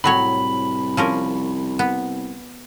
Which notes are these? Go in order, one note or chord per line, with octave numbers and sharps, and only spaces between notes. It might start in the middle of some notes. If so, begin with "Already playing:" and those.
C2 A2 F#3 C#5 B5
F3 C#4 A#4
B3